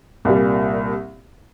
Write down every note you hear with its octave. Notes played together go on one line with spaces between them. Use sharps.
C2 A#2 G3